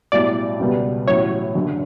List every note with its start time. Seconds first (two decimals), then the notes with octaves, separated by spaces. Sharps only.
0.12 B1 A2 G3 D5
0.59 C#2 B2 G3 B3
1.07 A1 A2 F#3 C#5
1.55 F#1 F#2 D3